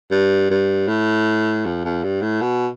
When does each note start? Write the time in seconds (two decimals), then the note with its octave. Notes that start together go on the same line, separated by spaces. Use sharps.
0.11 G2
0.50 G2
0.88 A2
1.65 F2
1.85 F2
2.04 G2
2.22 A2
2.41 B2